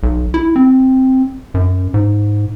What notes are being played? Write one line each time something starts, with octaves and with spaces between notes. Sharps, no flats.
B1
E4
C4
F#2
G#2